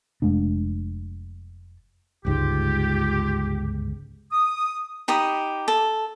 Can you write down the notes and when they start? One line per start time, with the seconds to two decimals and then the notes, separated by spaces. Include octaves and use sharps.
0.22 F1 G#3 A3 D4
2.25 G1 C#2 G#2 F4 G4
4.31 D#6
5.08 D#4 G4 B5 D#6
5.68 A4